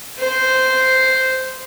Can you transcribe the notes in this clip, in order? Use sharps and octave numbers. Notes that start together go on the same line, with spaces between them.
C5